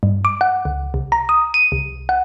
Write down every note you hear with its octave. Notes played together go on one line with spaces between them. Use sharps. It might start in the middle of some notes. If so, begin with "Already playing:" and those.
G2
D6
F#5
C#2
C2
A#5
D#6
D#7
C2
F#5